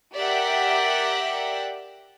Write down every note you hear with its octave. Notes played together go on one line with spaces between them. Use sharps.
G4 A#4 D5 E5 F#5 G5